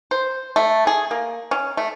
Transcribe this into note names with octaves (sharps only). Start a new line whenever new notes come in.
C5
A3
G#4
A#3
C#4
A3